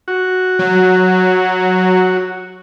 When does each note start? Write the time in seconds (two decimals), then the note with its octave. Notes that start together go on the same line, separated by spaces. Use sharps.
0.08 F#4
0.59 F#3